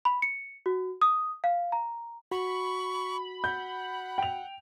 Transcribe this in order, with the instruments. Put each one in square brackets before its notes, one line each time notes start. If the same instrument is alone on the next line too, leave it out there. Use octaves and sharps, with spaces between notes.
[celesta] B5
C#7
F#4
D#6
F5
A#5
[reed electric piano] F#4 [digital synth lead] B5 [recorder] C#6
[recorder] F#5 [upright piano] G6
[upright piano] G5 F7